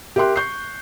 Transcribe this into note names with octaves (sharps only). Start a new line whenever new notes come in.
G4 A#4 E5 G5 C6 F#6
C#6 G6 C7